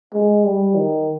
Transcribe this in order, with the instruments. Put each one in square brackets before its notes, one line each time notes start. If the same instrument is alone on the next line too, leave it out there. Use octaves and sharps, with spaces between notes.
[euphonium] G#3
G3
D#3